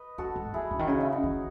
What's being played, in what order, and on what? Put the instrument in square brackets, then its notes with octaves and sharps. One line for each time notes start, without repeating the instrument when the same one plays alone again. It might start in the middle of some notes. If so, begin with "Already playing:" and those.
Already playing: [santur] B4 D#5
[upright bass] F#2 [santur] F#4 A4
[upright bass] G#2
[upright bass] D#3 [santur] E4 G#4
[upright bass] C#3
D#3
[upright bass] C#3 [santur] D#4 F#4
[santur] E4
D#4
[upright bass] D#3